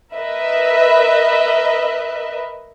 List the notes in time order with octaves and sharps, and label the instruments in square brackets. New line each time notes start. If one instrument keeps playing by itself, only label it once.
[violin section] A#4 B4 D#5 E5